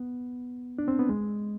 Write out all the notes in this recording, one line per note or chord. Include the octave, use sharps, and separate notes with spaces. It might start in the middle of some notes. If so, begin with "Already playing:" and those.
Already playing: B3
D4
C4
B3
G#3